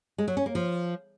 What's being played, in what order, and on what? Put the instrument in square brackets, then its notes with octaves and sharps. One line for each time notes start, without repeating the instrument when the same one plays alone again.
[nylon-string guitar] G#3
F#3
C#4
A#3
F3